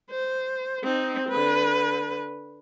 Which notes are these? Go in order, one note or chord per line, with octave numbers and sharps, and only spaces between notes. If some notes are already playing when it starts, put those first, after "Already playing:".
C5
C4 D#4
D3 B4